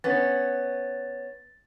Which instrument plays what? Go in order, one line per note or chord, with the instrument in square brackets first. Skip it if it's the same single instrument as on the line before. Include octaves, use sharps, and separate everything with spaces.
[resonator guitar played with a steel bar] B3 C#4 [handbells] A6